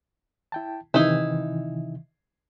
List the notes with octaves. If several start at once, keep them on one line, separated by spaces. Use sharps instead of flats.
E4 G5 A5
C3 D#3 E3 D#4 E4